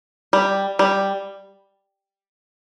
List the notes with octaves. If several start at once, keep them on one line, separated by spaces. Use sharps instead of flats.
G3
G3